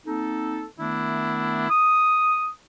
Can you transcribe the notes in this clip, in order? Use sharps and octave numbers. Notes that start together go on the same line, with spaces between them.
A#3 C4 D#4 A4
D#3 A3 B3 D4 E4
D#6